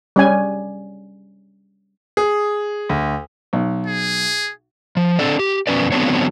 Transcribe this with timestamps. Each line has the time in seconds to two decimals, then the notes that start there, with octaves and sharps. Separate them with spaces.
0.16 G3 C#4 G#5
2.17 G#4
2.89 D2
3.53 B1
3.86 G#4
4.97 F3
5.19 C4 D4 A4 D5
5.39 G4
5.67 F2 B2 C#4 B4 D5
5.92 D3 F#3 B3 C4 D4 C#5